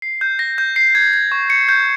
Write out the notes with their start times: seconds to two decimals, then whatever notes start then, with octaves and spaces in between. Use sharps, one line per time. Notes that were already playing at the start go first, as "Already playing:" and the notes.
0.02 C7
0.21 G6
0.39 A#6
0.58 G6
0.76 C7
0.95 G#6
1.13 G#6
1.32 C#6
1.50 C#7
1.69 G6